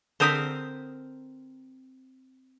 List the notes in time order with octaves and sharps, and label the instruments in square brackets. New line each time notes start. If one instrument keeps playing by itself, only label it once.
[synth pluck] D3 D#6 B6 [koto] C4 A#4 C5